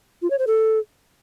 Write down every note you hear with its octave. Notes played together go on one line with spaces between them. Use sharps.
F4
C#5
C5
A4